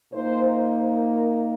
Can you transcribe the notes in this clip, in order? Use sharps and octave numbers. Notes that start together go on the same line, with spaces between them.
A#2 A#3 D#4 C5
C5
A#4